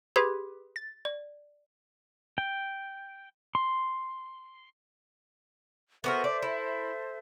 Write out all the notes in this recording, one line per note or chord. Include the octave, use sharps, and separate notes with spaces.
G4 G#4 B4 B5 C6 G#6
A6
D5
G5
C6
B3 F#4 A4 A#4 C5 E5
D5
E4